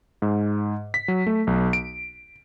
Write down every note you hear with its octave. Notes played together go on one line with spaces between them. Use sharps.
G#2
B6
F#3
A3
B1
D7